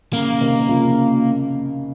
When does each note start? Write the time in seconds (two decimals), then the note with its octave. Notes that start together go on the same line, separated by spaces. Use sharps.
0.13 C#3 A#3
0.41 C3 D#3
0.69 C#3 F3